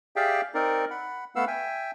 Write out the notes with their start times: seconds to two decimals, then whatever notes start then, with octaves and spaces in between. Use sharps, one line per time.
0.16 G4 G#4 D5 E5 F5 G5
0.54 C4 D#4 A#4 D5
0.90 F#5 B5
1.36 A3 B3 B4 F5 F#5 E6
1.47 E5 G5 G#5